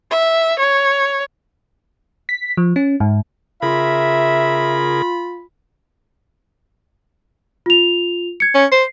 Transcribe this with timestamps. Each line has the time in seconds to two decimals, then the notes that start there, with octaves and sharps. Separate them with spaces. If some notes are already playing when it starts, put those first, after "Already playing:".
0.11 E5
0.59 C#5
2.29 B6
2.57 F3
2.76 C#4
3.00 G#2
3.62 C#3 F4 G#4 A#4 E5 B5
7.66 F4 F7
8.40 G#6 C#7
8.55 C#4
8.72 C5 C7